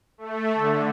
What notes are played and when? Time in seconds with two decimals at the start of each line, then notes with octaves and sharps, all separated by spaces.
0.18 A3
0.54 D3